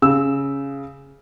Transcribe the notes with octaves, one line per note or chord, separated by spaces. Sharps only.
C#3 E6